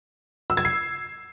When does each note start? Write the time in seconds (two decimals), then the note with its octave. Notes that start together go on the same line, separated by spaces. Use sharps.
0.50 E6
0.57 G#6
0.65 C7